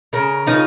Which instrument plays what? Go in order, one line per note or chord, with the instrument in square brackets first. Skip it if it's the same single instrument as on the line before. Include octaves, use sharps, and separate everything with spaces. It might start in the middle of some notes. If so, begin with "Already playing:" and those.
[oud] C#3 [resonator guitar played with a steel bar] A#4
[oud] C#3 F3 [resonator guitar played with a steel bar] D#4